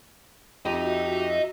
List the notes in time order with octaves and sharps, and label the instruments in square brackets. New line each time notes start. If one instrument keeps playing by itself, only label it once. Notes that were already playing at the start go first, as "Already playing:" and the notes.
[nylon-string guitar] F2 [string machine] F#4 E5 [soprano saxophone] G4 [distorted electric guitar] D#5 A#5